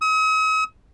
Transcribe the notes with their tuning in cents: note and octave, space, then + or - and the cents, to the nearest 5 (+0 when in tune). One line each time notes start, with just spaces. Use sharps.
D#6 +45